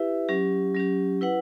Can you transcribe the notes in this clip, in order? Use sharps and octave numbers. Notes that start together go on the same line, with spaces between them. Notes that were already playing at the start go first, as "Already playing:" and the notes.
Already playing: E4 G4 B4 E5
F#3 C#4 G4
F#3 C#4 G4
E4 B4 F#5